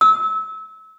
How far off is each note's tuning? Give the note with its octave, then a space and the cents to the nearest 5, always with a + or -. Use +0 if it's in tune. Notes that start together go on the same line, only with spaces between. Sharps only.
E6 -30